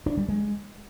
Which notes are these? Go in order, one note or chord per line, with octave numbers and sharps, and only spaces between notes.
D4
G3
G#3